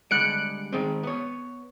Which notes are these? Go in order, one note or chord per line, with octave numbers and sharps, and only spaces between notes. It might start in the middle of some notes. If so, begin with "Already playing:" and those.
D3 G3 G#3 F#6 C#7 D7
D#3 G#3 C4
B3 C#5